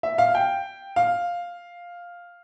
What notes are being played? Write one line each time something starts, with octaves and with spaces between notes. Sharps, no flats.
E5
F5
G5
F5